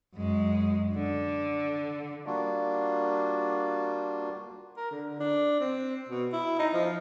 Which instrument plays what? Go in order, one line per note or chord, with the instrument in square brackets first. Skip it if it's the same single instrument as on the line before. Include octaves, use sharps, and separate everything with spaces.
[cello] F#2 G#3
D3
[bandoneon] G3 A#3 D4 F4 F#4
[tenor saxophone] A#4
D3
D4
C4
B2
E4
D#4
F3